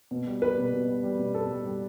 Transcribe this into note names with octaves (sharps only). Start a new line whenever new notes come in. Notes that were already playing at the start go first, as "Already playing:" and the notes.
B2
G3
G3 B4
B2
B2
G3
G3
B2
B2 A4
G3
G3